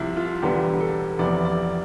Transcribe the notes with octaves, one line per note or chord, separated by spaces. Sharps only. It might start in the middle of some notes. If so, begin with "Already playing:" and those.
Already playing: C2 C3 F3 E4
F4
E1 E2 D3 G3 B3 G4
A4
F1 F2 C3 E3 B3 D5
D5